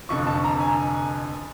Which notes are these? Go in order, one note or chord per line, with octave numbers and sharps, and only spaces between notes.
F1 F2 D3 C#6
A5
A#5
G#5